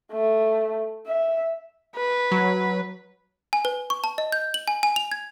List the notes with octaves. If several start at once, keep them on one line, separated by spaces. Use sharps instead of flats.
A3
E5
B4
F#3
G#5
B4
C#6
A5
D#5
G6
F#7
G#5
G#5
F7
G#6